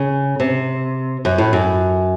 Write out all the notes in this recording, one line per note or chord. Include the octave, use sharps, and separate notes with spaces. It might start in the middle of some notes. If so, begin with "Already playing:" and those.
Already playing: C#3
C3
F#2
A2
F#2